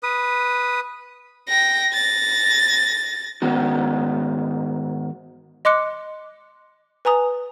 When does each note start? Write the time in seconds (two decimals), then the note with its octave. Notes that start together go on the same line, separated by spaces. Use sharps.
0.03 B4 D#6
1.49 G5 A#6
1.93 A6 A#6
3.42 G#2 D#3 B3 F#4
5.65 D#5 C6 D6 F#6 C#7
7.05 B4 G#5 A#5 D#6